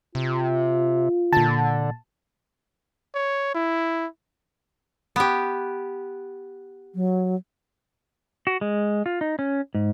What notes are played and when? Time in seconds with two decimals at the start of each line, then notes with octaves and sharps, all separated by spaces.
0.15 C3 F4
1.33 A#2 D3 A5
3.15 C#5
3.55 E4
5.16 B3 G4
6.95 F#3
8.47 F#4
8.61 G#3
9.06 F4
9.21 D#4
9.39 C#4
9.75 G#2